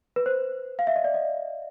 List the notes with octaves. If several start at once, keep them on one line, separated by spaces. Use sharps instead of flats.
B4
C5
F5
E5
D#5
D5
D#5